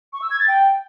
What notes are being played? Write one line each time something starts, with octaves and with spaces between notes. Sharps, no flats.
C#6
E6
G#6
A6
G5